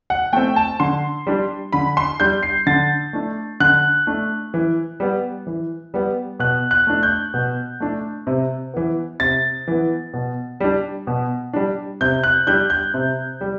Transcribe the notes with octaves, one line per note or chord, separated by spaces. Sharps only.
F#5
A3 C4 G5
A5
D3 C6
G3 D4
D3 B5
C6
G3 D4 G6
C7
D3 A6
A3 D4
D3 F#6
A3 D4
E3
G3 B3
E3
G3 B3
B2 F#6
F#6
A3 D4
G6
B2
A3 D4
C3
E3 B3
C3 A6
E3 B3
B2
G3 D4
B2
G3 D4
C3 G6
F#6
G3 D4 G6
G6
C3
G3